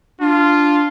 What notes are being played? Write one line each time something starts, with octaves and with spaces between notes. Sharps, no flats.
D4 F4